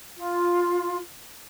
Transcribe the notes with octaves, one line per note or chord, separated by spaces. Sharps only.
F4